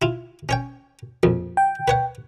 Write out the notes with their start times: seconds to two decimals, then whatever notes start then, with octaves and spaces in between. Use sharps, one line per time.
0.02 E4 F4
0.49 C#4 C#5 G5
1.23 A#1 F2
1.57 G5
1.88 B4 C#5 F#5